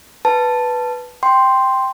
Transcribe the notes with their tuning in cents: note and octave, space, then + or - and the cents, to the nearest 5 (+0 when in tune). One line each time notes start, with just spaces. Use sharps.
B4 +0 A5 +0
G5 +0 C6 +0